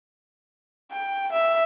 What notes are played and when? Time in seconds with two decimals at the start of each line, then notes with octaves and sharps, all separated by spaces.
0.91 G5
1.33 E5